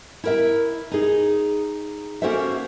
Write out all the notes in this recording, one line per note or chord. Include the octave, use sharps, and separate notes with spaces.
E4 A#4 E5
D#4 G#4
A#3 C#4 F#4 A4 C5 E5